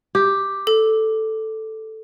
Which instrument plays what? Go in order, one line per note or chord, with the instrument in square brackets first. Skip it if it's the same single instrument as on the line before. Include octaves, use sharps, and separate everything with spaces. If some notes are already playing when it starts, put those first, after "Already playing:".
[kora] G4
[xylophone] A4